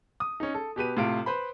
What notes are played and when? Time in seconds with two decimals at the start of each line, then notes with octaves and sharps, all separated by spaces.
0.20 D#6
0.40 C#4 D#4
0.54 A4
0.76 B2 G4 B4 D#7
0.97 A2 C3 F4 D7
1.26 B4 C5 B5